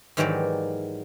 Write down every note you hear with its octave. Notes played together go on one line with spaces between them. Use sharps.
G#2 D#3 E3 F#3 G4 D5